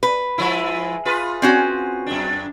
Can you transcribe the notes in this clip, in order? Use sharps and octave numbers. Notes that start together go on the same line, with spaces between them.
B4
F3 G#3 E4
F4 G#4 B4
C4 C#4 F#4
F#2 D4